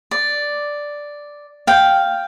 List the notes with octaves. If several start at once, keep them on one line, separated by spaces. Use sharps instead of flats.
D5
F5 G5